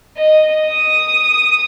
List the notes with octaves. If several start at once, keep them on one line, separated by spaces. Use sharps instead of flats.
D#5
D#6